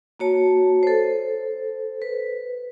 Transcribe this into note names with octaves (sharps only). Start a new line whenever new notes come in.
A#3 F#4 C#5 A5
A4 C5
B4